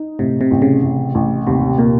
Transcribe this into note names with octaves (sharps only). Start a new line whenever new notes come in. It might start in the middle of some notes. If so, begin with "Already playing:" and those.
Already playing: D#4
A2 C3
C3
A1
C#3
A2
A1
D#2 C3
A#2 A#3